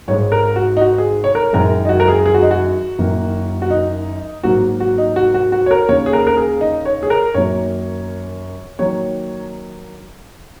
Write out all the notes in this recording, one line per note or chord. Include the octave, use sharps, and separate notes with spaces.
G#1 G#2 G#3 C#5
A#4
F#4
D#4
F#4
G#4
C#5
A#4
F#1 F#2 D#3 G#3 A#4
D#4
F#4
A#4
G#4
G#4
F#4
D#4
F#4
F#1 F#2 D#3 A#3
F#4
D#4
G#1 G#2 F#3 A#3 F#4
F#4
D#4
F#4
F#4
F#4
C#5
A#4
D#2 C#3 A#3 C#5
G#4
A#4
A#4
G#4
D#4
C#5
G#4
A#4
F#2 D#3 F#3 A#3 C#5
D#3 F#3 A#3 C#5